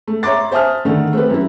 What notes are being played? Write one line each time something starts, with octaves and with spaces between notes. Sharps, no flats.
A3
C#5 E5 A#5 C6 D6 A6
C5 E5 G#5 A5 D#6 F6
D3 D#3 A3
A3 C4 G4 B4
F#2 E4